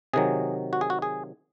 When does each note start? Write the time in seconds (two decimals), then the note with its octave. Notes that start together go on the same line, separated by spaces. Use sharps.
0.13 C3 D#3 F#3 G#4
0.73 F#4
0.81 G#4
0.90 F#4
1.02 G#4